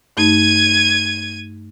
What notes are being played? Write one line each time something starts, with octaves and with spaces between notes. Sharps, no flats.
G2 A3 D#4 G#6 D#7